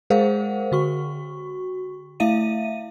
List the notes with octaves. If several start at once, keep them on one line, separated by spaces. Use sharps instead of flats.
G#3 G#4 A#4 C5 F5 F#5
D3 F#4 C#6
A3 E4 E5 F5 D#7